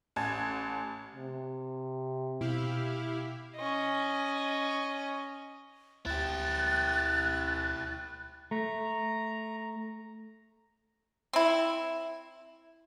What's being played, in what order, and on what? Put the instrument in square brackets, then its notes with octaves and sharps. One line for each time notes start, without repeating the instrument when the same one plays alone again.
[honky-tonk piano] A1 G#5 A5 G#6
[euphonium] C3
[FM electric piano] B2 [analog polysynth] E4 G4 F5
[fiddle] C#4 D#5
[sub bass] D2 [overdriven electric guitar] E4 G4 [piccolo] F#6 [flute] A6
[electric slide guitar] A3 [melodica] A#5
[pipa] C4 E4